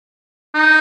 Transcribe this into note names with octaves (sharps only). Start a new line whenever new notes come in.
D#4